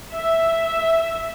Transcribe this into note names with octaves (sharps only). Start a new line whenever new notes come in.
E5